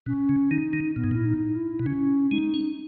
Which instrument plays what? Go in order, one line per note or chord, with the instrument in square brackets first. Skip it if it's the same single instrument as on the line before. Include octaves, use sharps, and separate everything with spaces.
[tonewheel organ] B2 [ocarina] C#4
[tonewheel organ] C#3
[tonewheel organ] D#3 [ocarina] D#4
[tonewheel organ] D#3
[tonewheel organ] A#2 [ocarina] B3
[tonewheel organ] G#2
[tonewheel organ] A#2 [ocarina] E4
[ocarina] D#4
E4
[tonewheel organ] B2
[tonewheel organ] C#3 [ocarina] C#4
[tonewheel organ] G#3 [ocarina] D#4
[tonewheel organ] C#4